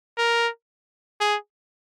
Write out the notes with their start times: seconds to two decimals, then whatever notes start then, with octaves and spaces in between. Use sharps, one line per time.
0.18 A#4
1.21 G#4